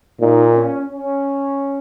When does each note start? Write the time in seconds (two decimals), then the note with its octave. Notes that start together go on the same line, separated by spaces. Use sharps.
0.20 A#2 D#4
0.55 C#4
0.89 C#4